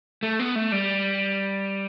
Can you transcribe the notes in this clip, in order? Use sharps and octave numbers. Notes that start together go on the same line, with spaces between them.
A3
B3
A3
G3